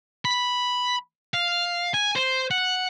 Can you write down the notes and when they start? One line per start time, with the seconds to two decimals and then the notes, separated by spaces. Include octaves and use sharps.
0.25 B5
1.34 F5
1.94 G#5
2.16 C5
2.51 F#5